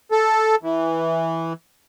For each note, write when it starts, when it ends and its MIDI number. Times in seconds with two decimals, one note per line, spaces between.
0.12 0.55 69
0.63 1.53 52